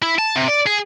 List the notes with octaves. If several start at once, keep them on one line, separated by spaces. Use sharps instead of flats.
E4
A5
C3
D5
G#4